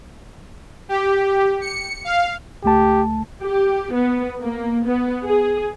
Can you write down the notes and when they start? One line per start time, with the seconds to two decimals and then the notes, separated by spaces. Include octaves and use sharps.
0.89 G4
1.61 C#7
2.04 F5
2.64 C#2 A3 G4 A5
3.43 G4
3.93 B3
4.42 A#3
4.85 B3
5.25 G#4